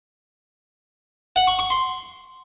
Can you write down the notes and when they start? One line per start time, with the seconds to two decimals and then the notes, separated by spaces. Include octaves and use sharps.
1.36 F#5
1.47 C#6
1.59 C#6
1.70 C6